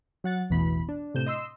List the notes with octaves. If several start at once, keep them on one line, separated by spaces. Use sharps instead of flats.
F#3 F#5 A6
A1 E2 B2 E3 B5
D4
A2 C3 G6 E7
D#5 C6 E6